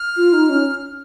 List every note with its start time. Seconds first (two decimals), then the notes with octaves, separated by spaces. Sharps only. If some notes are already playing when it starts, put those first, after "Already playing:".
Already playing: F6
0.17 F4
0.33 D#4
0.49 C#4